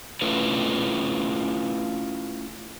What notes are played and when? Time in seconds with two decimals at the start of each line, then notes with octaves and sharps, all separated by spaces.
0.21 A3 C#4 E4 F4 A4 B4